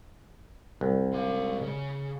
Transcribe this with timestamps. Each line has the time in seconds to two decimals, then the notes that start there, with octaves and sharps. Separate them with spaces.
0.81 C2
1.13 G#3 F5
1.61 C#3